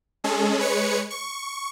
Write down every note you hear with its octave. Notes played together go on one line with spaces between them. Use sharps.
G#3 C#4 G#4 A4
G#3 B4 C#5 C#7
C#6